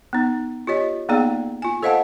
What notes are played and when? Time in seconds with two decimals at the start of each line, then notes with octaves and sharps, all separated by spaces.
0.13 B3 D#4
0.67 F4 G4 C#5 D#5
1.09 A#3 B3 D#4 G#4 D5 G5
1.62 F4 G#5
1.83 A4 C5 D#5 F5 F#5 A5